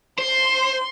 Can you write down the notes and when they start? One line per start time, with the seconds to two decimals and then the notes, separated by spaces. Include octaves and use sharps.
0.19 C5 C6